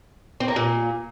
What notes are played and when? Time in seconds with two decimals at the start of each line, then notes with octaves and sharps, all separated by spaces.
0.40 C4
0.48 A#3
0.56 A#2